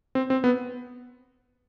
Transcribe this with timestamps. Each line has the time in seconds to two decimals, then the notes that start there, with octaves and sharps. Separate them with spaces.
0.15 C4
0.30 C4
0.44 B3